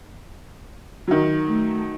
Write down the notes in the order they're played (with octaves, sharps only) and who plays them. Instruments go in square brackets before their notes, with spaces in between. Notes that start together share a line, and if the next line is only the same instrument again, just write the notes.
[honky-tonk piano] D#3 F#3
[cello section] A3